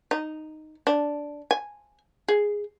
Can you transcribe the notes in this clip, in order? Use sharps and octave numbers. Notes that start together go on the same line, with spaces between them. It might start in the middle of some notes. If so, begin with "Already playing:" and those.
D#4
D4
G#5
G#4